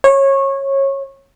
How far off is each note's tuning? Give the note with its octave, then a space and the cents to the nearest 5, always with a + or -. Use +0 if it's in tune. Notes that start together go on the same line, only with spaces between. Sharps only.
C#5 -20